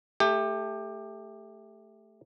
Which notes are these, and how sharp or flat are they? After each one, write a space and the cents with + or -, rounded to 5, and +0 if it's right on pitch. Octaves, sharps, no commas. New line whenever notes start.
A3 +0 G4 +20